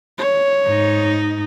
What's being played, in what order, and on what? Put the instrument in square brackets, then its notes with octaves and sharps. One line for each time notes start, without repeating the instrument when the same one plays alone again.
[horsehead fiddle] C#5
[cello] G#2 D#4